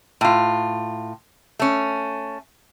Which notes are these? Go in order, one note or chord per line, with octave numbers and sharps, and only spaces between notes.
A2 F4
A3 C#4